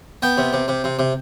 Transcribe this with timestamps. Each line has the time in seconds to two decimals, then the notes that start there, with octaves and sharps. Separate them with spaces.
0.22 B3 G5
0.38 C3
0.53 C3
0.68 C3
0.84 C3
0.99 C3